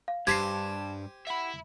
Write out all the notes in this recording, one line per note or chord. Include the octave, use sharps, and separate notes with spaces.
F5
G2 G4 C5 G#5 A5 G#6 B6 C7
E5 F#5 B5